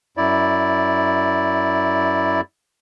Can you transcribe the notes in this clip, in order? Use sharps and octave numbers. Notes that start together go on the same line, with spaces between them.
F#2 E4 D5